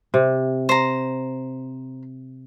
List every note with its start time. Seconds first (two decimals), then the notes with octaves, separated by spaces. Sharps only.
0.14 C3
0.69 C5 A#5